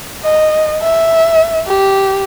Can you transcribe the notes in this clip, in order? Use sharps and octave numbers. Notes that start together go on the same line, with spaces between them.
D#5
E5
G4